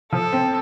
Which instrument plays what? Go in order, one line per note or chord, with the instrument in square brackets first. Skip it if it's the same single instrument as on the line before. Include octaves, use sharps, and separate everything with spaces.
[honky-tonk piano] F3 [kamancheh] A4
[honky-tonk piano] C4